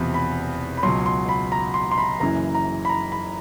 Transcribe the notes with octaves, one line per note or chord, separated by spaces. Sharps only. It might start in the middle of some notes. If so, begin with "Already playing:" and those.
Already playing: E1 E2 C3 F3 B5
B5
B5
C#2 B2 F#3 C6
C6
B5
A#5
C6
C6
B5
F#1 F#2 C#3 E3 A#5
A#5
B5
A#5
B5